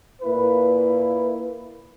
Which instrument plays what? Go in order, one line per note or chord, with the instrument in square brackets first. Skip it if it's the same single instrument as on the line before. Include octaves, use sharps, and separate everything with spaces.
[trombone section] A#2 A#3 E4 B4